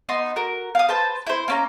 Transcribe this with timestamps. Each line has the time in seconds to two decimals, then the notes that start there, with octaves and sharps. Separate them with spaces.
0.09 B3 D#4 C6
0.36 F#4 A#4
0.75 F5 D#6
0.89 B4 C5 A5
1.27 E4 C5
1.48 A#3 C#4 A#5